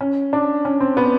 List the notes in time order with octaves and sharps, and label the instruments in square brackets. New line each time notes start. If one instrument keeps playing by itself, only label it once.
[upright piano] C#4
D4
C#4
C4
B3